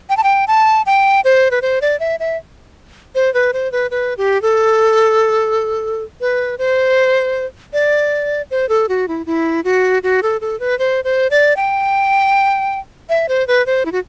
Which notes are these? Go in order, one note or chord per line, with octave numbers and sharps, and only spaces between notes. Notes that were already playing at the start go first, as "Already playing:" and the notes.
G5
A5
G5
A5
G5
C5
B4
C5
D5
E5
E5
C5
B4
C5
B4
B4
G4
A4
B4
C5
D5
C5
A4
F#4
E4
E4
F#4
F#4
A4
A4
B4
C5
C5
D5
G5
E5
C5
B4
C5
E4
F#4